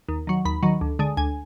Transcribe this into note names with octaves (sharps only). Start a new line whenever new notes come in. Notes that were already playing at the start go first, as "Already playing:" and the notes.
D#2
D#3 F#3
D#2 B5
D#3 F#3
D2
D3 G#3
D2 G#5